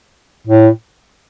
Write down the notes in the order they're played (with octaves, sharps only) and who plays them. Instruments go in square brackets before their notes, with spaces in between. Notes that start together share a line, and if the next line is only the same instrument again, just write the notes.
[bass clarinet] A2